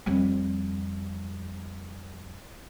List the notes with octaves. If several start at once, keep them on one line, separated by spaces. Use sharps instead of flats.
F2 G3